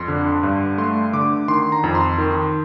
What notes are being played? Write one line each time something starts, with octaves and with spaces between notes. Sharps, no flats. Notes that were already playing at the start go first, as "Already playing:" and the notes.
Already playing: F2 C6
D3
G2
A3 C6
D3 D6
D#3 C6
A#5
F2
C6
D#3